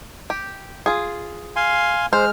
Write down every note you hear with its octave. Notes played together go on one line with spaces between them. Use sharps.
G4
F4 G#4
F5 G#5 C6
G#3 C5 F6